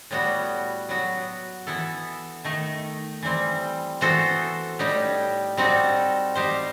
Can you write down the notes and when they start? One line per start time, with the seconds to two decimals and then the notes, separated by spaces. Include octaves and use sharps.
0.11 A2 G3 B3 F#4
0.89 F#3 B3 F#4
1.67 E3 B3 E4 A4
2.44 D#3 A3 D#4
3.23 E3 G3 C4
4.01 E3 B3 F#4 A4 C5
4.79 A2 G3 D#4 G4
5.57 G3 C4 D#4 F#4 A4
6.35 G3 D#4 G4 C5